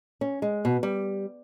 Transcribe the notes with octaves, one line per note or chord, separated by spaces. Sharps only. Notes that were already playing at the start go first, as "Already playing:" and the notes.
C#4
G#3
B2
G3